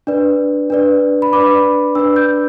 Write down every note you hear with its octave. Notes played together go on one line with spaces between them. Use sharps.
D4 B4 D5
D4 B4 D5
B5
D4 B4 D5 D6
D4 B4 D5 E6
G6